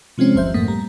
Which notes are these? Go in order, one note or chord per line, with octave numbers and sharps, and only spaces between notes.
C3 F3 G#3 C4 C#4
G1 D#2 F3 C5 E5 G6
F#2 A2 A3 A#3 D#6 B6
G3 A#5